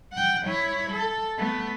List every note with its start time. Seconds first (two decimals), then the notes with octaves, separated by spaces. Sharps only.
0.13 F#5 G5
0.46 E4 C#5
0.91 A4
1.38 A3 B3